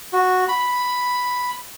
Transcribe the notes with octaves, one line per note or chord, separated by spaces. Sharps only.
F#4
B5